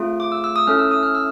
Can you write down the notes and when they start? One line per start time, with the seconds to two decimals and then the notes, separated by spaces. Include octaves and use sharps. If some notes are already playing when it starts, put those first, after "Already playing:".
Already playing: A3 C4 F4 G#4
0.20 D6
0.32 E6
0.44 E6
0.56 D#6
0.67 A3 C#4 E4 A4 F6
0.79 E6
0.91 D#6
1.03 F6
1.15 E6